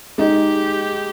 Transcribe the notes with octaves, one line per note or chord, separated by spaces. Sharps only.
G#3 D#4 G4 G#4